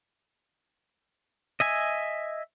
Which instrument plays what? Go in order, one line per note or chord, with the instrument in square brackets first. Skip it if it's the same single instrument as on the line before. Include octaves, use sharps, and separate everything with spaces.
[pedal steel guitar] D#5 E5 G#5